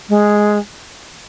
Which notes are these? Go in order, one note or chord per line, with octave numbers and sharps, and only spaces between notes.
G#3